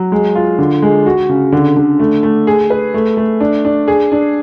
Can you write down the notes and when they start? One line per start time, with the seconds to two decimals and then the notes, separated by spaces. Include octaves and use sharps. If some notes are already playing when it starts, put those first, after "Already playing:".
Already playing: F#3
0.12 G#3
0.35 F4
0.59 D3
0.82 G#3
1.06 F#4
1.29 C#3
1.52 D3
1.77 D3
1.99 A3
2.23 A3
2.47 G#4
2.70 B4
2.94 A3
3.17 A3
3.40 D4
3.65 D4
3.88 G#4
4.12 D4